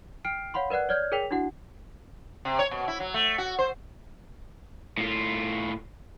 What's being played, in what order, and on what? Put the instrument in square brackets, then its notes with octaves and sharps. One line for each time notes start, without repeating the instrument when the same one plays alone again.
[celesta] G5 F6 C7 D7
C#5 F5 F#5 B5 C6
A#4 B4 D5 F#5 F#6
C#5 D5 F6 G6 G#6
G#4 A#4 C#5 G5 B6 F7
D4 E4 F#4 F#5
[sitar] C3
C#5
B2
E4
F#3
A3
F#4
C5
[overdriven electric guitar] A2 F4